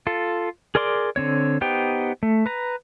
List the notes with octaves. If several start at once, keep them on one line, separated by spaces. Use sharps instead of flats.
F4 A4
G#4 A#4 D5 C6 D6
D3 C4 C#5
B3 D#4 G4 C5 G5
A3
B4 A#5